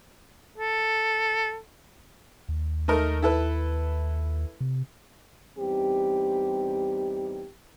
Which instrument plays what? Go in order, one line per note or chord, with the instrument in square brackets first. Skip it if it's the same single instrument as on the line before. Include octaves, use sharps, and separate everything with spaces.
[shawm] A4
[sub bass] D#2
[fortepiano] A3 D#4 A#4
E4 A4 B4
[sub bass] C3
[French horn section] E2 G3 C4 D#4 G4